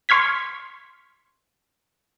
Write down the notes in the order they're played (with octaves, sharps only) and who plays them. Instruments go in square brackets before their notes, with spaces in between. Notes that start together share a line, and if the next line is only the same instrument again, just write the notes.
[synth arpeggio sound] C6 C#6 F6 G#6 B6